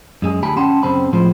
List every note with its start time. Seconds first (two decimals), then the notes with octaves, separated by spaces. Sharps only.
0.22 F#2 G#3 G#4
0.43 D2 G4 G#5 A5 B5
0.57 C#4 F#5 G5 A5 C6
0.83 F#2 C#3 C4 B5
1.13 A2 F3 G#3 C5